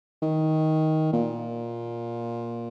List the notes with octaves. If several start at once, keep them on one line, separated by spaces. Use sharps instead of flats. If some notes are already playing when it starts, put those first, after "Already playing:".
D#3
A#2